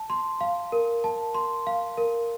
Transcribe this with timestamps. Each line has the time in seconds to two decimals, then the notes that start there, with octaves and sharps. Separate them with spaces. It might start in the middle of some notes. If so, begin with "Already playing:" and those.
Already playing: A5
0.10 C6
0.41 F5
0.72 A#4
1.04 A5
1.34 C6
1.67 F5
1.97 A#4